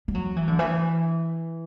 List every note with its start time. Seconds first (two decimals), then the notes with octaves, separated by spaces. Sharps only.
0.08 G3
0.15 F#3
0.36 E3
0.48 D3
0.59 E3